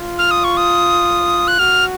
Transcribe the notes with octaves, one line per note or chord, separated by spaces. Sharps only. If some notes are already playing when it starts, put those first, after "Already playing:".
Already playing: F4
F6
D#6
C#6
D#6
F#6
F#4 F6